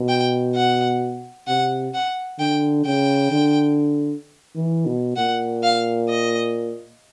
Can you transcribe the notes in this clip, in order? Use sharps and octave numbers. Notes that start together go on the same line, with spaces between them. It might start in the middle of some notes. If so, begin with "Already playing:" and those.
Already playing: B2
G5
F#5
C3 F#5
F#5
D3 G5
C#3 G5
D3
E3
B2
A#2 F#5
F5
D#5